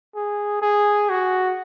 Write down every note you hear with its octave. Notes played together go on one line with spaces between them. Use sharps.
G#4
G#4
F#4